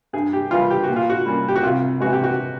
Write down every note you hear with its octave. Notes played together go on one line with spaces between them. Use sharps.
G2 G#4
G4
E3 G3 F4
G4
F#4
A#2
F4
F#4
G3 A#3 C#4
G4
F#4
C2 F4
C3 E3 G#3 F#4
G4
F#4